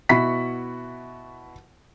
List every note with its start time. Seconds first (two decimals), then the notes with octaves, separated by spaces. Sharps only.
0.09 B2 E4 F#4 B5 C#6 B6